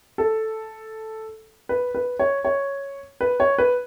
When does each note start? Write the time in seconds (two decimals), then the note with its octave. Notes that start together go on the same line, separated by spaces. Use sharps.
0.18 A4
1.69 B4
1.95 B4
2.19 C#5
2.45 C#5
3.21 B4
3.40 C#5
3.58 B4